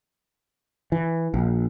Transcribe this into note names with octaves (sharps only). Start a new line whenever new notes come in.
E3
A#1